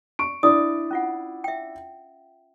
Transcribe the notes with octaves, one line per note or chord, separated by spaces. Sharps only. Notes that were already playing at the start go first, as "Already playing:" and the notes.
C#6 D7
D4 E4 D5 D#6
C#4 F4 F#5
E5 G5